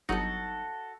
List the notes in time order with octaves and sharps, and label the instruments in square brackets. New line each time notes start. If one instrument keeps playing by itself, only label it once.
[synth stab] G1 F#3 D#4 [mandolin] F#4 A4